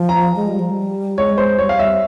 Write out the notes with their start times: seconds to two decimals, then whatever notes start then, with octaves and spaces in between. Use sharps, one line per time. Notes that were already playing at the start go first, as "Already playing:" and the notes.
Already playing: F3
0.09 A#5
0.36 G#3
0.48 G3
0.59 F3
0.71 G3
1.18 G#3 C#5
1.38 C5
1.58 G3 C#5
1.69 F5
1.79 E5